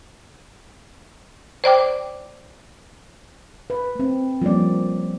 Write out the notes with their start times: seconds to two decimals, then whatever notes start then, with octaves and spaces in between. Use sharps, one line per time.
1.64 C5 D5 G5 D6
3.70 B4
3.95 A3 C4
4.42 F3 G3 A#3 C#4 D5